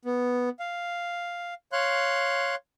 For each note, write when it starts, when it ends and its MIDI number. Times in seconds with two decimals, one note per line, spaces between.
0.05 0.49 59
0.60 1.54 77
1.73 2.55 73
1.73 2.55 77
1.73 2.55 84
1.73 2.55 90